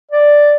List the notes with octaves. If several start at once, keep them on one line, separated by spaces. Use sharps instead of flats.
D5